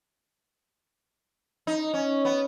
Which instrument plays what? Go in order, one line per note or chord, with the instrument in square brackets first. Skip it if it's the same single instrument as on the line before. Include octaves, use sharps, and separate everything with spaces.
[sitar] D#4
C#4
B3